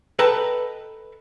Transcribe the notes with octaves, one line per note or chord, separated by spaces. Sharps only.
A4 B4 D#5 G5 A5 A#5